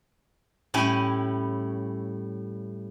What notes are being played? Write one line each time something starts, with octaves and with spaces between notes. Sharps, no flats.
A2 G3 C#4 E4 G#5